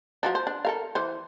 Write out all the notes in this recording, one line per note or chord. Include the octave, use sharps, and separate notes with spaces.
F3 F#3 D4
C5
D4
A4 A#4 F5
E3 C5